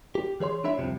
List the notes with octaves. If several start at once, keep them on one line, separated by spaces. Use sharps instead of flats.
G4
E3 G#4 C#5 C6
D4 E4 C#5 E5
C2 F2 C3 F3